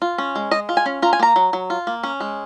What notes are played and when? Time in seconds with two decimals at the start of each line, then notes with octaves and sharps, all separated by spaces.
0.02 F4
0.18 C#4
0.36 G#3
0.51 G#3 D#5
0.69 F4
0.77 G#5
0.86 C#4
1.02 F4 A#5
1.13 G#5
1.19 A#3 A#5
1.36 F#3
1.53 F#3
1.70 F4
1.87 A#3
2.03 C#4
2.20 G#3